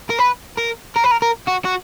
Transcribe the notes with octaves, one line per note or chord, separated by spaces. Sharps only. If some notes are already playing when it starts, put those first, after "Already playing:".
A#4
B4
A#4
A#4
B4
A#4
A#4
F#4
F#4